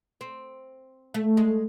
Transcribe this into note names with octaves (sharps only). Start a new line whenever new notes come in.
C4
A3
G#3